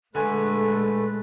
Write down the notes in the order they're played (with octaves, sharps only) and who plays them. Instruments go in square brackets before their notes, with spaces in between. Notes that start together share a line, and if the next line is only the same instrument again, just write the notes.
[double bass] A#2 G#3 [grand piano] D3 G#5 [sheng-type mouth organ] A3 B4 [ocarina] A4